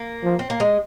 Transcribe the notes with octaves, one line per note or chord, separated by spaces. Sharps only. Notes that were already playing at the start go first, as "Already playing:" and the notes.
Already playing: A#3
F3
C4
A#3
G#3